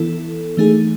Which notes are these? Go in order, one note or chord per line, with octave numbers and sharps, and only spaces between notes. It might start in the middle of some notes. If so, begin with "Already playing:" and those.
Already playing: E3 B3 E4 A4
E3 A3 D#4 G#4